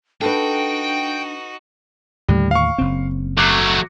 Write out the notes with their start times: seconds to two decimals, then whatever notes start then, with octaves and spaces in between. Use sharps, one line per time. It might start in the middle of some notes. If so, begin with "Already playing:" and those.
0.21 D4 D#4 F#4 A4 B4 G5
2.28 D#2 A2 D3 G3
2.51 F5 C#6
2.78 F#1 C#3 C4
3.37 F#3 A3 D6 F#6 C7